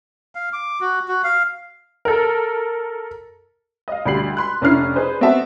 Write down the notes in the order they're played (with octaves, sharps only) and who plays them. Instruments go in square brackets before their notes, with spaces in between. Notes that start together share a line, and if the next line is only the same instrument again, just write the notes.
[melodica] F5
D6
F#4
F#4
F5
[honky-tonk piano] A4 A#4
D#5 F5
D2 G3 B5 C7 F#7
B5 C6 F#6
F1 C#4 D4 E4 F6 C7
D#4 G#4 B4 C5
B3 C4 F#4 A4 E5 A5